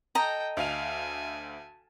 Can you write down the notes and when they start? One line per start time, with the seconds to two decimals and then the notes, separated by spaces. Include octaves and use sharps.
0.15 A4 D#5 G5 A#5
0.57 D2 F5 G#5 A5 F7